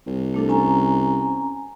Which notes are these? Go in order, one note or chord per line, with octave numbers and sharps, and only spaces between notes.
C2
A3 D4 A4
C#4 G#5 A#5